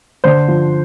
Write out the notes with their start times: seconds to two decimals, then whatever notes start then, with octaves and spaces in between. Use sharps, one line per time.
0.24 D3 C5
0.48 F3